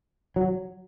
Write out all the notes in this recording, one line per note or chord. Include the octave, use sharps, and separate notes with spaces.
F#3